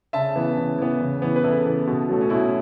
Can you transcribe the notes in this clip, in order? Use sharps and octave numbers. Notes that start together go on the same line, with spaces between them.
C#3 E5 A5
E3 B3
C#3
E3 B3
C#3
E3 B3
B4
C#3 E4 A4
E3 B3
B2
F#3 A3
C#4
B2 E4